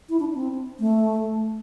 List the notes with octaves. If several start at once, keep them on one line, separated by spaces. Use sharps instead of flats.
E4
D4
C4
A3